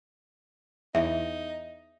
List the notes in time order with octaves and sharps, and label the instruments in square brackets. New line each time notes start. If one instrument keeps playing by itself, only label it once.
[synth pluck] E2 [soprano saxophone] D#4 [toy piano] E5